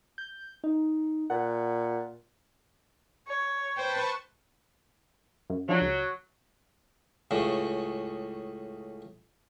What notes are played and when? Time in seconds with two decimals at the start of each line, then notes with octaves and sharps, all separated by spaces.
0.18 G6
0.64 D#4
1.30 A#2 F#5
3.27 C#5
3.77 B4 C5 G5 A5 C#6
5.50 F#2
5.69 F3 F#3 D4
5.81 C#2
7.31 C#2 A2 C#3